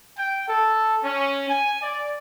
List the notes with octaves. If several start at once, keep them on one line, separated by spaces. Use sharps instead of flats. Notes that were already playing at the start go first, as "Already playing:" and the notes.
G5
A4
C#4
G#5
D5